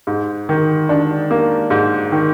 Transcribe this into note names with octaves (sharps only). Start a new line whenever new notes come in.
G#2
D#3
D4
A#3
G#2
D#3